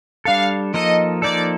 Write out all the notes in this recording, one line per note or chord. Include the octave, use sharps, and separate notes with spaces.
G3 D4 A4 F5
F3 A#3 D#4 A4 D#5
F3 A#3 D#4 A4 D5